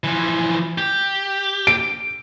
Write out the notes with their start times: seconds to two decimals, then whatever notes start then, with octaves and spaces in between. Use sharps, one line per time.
0.04 E3 F3
0.78 G4
1.67 D7